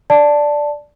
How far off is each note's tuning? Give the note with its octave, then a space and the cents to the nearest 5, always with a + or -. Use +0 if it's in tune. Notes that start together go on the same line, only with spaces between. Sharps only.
D5 +0 A5 +0